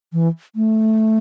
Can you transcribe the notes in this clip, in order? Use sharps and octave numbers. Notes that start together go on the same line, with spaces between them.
E3
A3